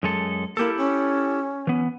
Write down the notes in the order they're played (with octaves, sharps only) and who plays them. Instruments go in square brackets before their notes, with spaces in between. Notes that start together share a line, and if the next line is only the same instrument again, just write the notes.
[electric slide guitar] F#2 G#3 A4
[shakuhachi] A#3 [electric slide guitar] E4 G4 A4
[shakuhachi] C#4
[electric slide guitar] E3 B3